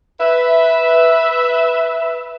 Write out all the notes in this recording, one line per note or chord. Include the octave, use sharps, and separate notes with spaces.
B4 E5